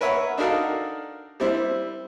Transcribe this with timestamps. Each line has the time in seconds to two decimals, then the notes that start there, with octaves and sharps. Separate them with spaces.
0.01 A#4 B4 C#5 E5 F#5
0.37 D4 D#4 F#4 A4 A#4 F5
1.40 G3 C4 E4 C5